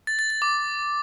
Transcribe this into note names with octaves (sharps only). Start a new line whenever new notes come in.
A6
A6
A6
D6